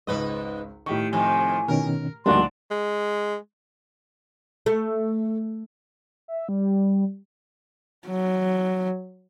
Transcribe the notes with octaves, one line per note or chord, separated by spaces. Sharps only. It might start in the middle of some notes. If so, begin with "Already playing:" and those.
G#1 C#2 G#2 B4 D#5
A2 D#3 G4 C#6
F2 C3 D#3 G#5
B2 D#3 C#4 A#4
D2 F3 G3 A#3 D4 D#4 F#4 C6
G#3
A3
E5
G3
F#3